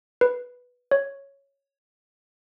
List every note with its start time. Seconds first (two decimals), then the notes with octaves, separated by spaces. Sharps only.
0.21 B4
0.91 C#5